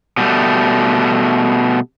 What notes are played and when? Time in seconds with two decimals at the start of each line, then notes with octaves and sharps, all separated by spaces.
0.17 B2 G3 A3